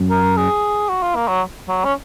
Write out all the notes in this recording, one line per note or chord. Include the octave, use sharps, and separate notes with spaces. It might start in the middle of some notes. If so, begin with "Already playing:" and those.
Already playing: F#2
A#4
G#4
F#4
F4
A#3
F#3
F#3
C#4